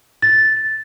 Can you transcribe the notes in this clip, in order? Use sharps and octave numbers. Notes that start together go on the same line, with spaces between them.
A6